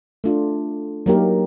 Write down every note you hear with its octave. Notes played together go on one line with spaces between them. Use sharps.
A3 D4 F4
F#3 A#3 D#4 G4 A#4